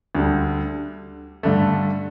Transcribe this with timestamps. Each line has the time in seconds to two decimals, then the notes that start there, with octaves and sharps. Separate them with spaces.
0.15 D2 D3 G3
1.43 G2 D3 A3